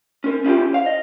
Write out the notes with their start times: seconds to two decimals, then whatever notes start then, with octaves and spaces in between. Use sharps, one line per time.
0.24 C#4 A#4
0.44 C#4 E4 F4 G4
0.74 F5
0.86 D#5